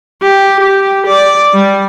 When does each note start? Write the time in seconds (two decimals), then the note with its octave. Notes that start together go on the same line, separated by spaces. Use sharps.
0.22 G4
0.59 G4
1.06 D5
1.53 G3